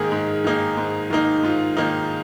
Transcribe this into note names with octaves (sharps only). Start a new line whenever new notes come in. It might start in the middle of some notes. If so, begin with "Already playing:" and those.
Already playing: G#2 D#3 A#3 D#4 G#4 A#4 D#5
G#2
D#3 A#3 D#4
G#2
D#3 A#3 D#4
G#2 F4
D#3 A#3 D#4